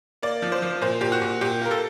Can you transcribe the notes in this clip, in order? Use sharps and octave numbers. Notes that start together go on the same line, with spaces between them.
A#3 D5
F3
C5
F3
A#2 C5
A#2 G4
F#4
A#2
A#2 G4
A#3 A#4
A4